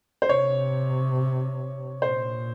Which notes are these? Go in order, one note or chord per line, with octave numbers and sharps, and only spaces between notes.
C5
C3 C#5
A#2 C5